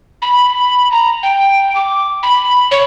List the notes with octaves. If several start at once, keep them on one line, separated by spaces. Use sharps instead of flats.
B5
A#5
G5
D6
B5
C#5